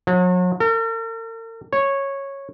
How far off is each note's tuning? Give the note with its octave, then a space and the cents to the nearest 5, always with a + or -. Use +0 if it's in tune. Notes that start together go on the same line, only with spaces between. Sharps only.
F#3 -40
A#4 -45
C#5 -10